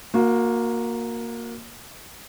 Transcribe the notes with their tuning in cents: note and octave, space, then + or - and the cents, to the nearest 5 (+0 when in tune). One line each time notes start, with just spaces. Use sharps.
A#3 +0 F#4 -30